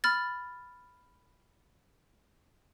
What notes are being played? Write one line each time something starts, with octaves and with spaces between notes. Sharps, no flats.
B5 F6 A6